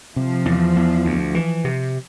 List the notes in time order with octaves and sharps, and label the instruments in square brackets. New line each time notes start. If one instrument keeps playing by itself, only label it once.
[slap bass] C3 [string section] F3
[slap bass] E2
E2
D2
E3
C3